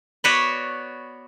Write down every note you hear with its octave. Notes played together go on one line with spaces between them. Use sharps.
B3 F#4 B4 C#5 D5